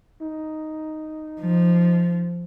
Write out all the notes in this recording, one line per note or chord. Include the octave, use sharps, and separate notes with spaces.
D#4
F3